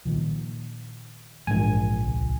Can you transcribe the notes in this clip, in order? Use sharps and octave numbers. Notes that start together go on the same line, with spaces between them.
A#2 D#3 F3
A#1 G#2 E3 G#5
C#2